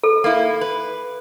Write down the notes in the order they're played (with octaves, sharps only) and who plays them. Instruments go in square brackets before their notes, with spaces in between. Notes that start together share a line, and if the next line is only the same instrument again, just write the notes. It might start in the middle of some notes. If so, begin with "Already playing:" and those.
[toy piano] A4
[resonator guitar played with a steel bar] A#3 E4
B4